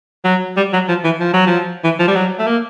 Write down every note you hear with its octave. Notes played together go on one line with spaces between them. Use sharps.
F#3
G3
F#3
F3
E3
F3
F#3
F3
E3
F3
G3
F#3
A3
A#3